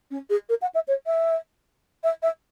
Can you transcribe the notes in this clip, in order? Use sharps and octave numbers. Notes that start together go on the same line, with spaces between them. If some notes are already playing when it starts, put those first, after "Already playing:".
C#4
G#4
A#4
F#5
E5
C#5
E5
E5
E5